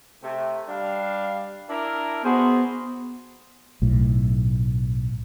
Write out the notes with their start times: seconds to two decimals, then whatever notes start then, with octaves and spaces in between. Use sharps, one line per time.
0.23 C3 A3
0.68 G3 D4 F5
1.70 D4 E4 A#4
2.24 B3 F#4 G#4 C5
3.82 B1 A2